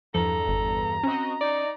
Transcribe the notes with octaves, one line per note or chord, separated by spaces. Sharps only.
E2 G2 F3 A4 A#5
G1
C4 C#4 F#4 D#5
D#4 D5